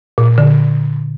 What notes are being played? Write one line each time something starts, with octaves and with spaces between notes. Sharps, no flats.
A#2
D3